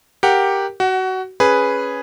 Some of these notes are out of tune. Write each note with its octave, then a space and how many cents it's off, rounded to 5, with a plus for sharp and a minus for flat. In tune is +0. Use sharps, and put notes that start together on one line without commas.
G4 +0 A#4 +0 F#5 +0
F#4 +20 F#5 +0
C#4 +0 G#4 +0 B4 +0